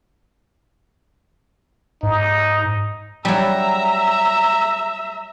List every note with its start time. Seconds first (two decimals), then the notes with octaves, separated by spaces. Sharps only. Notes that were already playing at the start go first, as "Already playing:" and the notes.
2.03 G#2 D#4
3.25 F#3 G3 E5 A#5